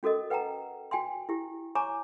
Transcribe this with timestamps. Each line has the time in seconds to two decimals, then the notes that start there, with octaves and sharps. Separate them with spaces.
0.03 C#4 F#4 A4 A#4 D#5
0.30 B4 F#5 G5 A5 A#5
0.91 F#4 G5 G#5 C6
1.29 E4 G4
1.75 C#5 G#5 A#5 C#6 D6